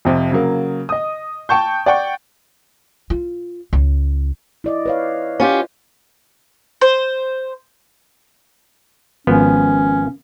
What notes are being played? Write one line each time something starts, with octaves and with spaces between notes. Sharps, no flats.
F2 C3 F3
C#3 F#3 A#3
D#5 D#6
G5 A5 C#6 G6
D5 F#5 G5 C#6
F4
C#2
E4 D5 D#5
B4 C#5 F5
C#4 F4 G4
C5
G#1 F3 B3 C#4